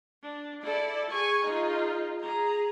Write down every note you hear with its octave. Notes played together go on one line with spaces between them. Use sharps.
D4
E4 A4 D5
G#4 G#5 C#6
D#4 F4 G#4
G#4 A#5